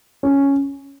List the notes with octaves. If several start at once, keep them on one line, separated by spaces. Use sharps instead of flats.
C#4